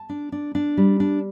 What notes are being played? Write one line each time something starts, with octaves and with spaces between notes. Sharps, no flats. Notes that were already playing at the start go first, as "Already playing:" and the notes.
Already playing: A5
D4
D4
D4
G3
D4